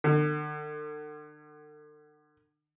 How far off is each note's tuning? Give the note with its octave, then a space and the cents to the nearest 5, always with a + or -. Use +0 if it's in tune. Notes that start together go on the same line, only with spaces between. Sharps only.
D3 +40